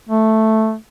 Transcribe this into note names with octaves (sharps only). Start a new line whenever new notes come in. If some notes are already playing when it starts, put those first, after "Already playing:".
A3